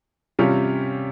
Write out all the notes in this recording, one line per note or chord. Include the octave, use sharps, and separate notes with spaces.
C3 G3 C#4 F4